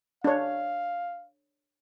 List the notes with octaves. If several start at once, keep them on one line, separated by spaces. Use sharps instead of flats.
D4 C#5 F5